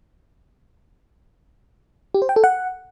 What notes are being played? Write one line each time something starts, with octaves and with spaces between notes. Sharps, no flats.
G4
C5
G5
A4
F#5